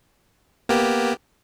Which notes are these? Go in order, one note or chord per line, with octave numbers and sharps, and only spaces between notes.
A#3 B3 G4